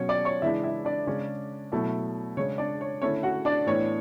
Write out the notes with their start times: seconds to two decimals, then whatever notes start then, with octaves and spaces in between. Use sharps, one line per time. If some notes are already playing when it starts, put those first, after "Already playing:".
Already playing: B2 F#3 C#4 C#5
0.09 D5 D6
0.25 C#5 C#6
0.42 C#3 E3 G#3 D4 E4 E5
0.64 E4 E5
0.85 D4 D5
1.07 C#3 G#3 C#4
1.72 B2 F#3 A3 E4
2.37 C#3 G#3 D4 C#5
2.58 D4 D5
2.81 C#5
3.02 D3 A3 C#4 E4 C#5
3.23 F#4 F#5
3.45 D4 D5
3.67 A2 E3 B3 D4 C#5